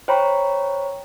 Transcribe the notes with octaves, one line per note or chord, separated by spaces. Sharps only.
C5 C#5 G5 A#5 B5 C#6